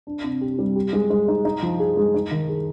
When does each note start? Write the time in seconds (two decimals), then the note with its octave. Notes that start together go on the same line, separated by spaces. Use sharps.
0.07 D4
0.24 C3
0.41 G4
0.59 G3
0.76 G4
0.93 G#3
1.10 G#3
1.28 D#4
1.45 D#4
1.63 F3
1.80 G#4
1.97 G#3
2.14 D#4
2.31 D#3
2.49 G#4